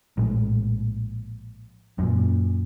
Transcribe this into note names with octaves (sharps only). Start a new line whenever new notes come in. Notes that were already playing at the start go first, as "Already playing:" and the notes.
A#1 A2 G#3
F#2 A#2